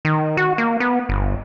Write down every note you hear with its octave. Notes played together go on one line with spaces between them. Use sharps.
D#3
F#4
A#3
B3
G1